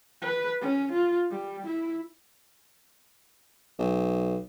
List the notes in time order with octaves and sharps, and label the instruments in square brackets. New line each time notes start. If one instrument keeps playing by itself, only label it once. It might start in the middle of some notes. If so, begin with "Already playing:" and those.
[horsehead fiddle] B4
C#4
F4
G3
E4
[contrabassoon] B1